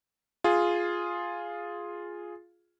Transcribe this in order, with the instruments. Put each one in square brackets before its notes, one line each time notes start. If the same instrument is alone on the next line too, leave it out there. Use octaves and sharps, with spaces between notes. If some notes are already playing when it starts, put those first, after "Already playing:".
[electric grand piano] F4 G#4